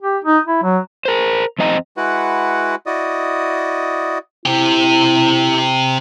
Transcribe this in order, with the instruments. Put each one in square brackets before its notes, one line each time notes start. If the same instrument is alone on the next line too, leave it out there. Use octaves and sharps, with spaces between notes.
[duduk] G4
D#4
E4
F#3
[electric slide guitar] A#4 C5
F2 C4 D#5 A#5
[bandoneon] G#3 E4 F#4 B4 F#5
E4 F#4 D5 D#5 D#6
[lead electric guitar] C3 G4 [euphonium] E4